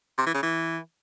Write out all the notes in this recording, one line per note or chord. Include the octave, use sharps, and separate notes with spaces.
C3
E3
C#3
E3